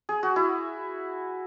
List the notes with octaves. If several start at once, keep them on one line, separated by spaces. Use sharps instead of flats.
G#4
F#4
E4